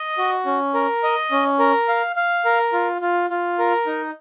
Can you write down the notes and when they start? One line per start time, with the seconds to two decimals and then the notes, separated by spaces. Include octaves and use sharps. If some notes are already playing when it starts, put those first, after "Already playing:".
Already playing: D#5
0.18 F#4
0.46 C#4
0.74 A#4
1.03 D#5
1.31 C#4
1.59 A#4
1.88 F5
2.16 F5
2.45 A#4
2.73 F4
3.01 F4
3.30 F4
3.59 A#4
3.87 D#4